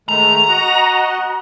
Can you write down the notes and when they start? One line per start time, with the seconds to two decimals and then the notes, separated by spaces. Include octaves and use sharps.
0.09 D#3 G#3 A3 A#5
0.48 F#4 D#5 F#5